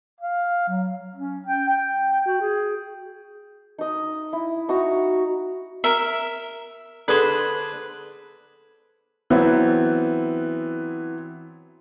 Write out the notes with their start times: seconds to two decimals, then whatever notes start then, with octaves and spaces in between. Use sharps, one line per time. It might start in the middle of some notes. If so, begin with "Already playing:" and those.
0.21 F5
0.68 F#3
1.16 C#4
1.47 G5
1.68 G5
2.26 F#4
2.41 G#4
3.78 D#4 D#5
4.33 E4
4.69 D#4 F#4 A#5 C#6
5.84 A#4 E5
7.08 D3 D4 G#4 B4 C5
9.30 E3 F#3 B3 C4 E4